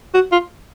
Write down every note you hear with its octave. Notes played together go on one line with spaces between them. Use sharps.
F#4
F4